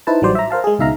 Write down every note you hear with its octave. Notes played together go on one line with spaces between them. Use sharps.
D#4 E4 B4 C5 A5
A1 F#3 G3 C5 D5
E5 A#5
A#4 C5 F5 A5
G#3 G#4
C#2 B2 D#4 E5 F5 A#5